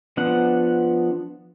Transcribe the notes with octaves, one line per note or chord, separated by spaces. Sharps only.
F3 B3 D4 F#5